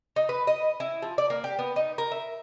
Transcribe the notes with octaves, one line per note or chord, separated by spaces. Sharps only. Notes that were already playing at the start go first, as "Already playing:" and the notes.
D#4
B4
D#5
E4
F3
D5
A#3
G4
B3
D#4
A#4
E5